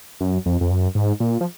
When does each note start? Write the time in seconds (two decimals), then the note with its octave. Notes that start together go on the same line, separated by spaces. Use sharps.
0.21 F#2
0.46 F2
0.61 F2
0.70 F#2
0.95 G#2
1.20 A#2
1.41 F3